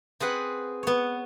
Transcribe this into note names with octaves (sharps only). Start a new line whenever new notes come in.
C4 G#4 B4 F#5
B3 C#5